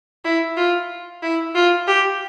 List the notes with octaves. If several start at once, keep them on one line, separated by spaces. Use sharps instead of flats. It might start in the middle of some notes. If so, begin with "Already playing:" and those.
E4
F4
E4
F4
G4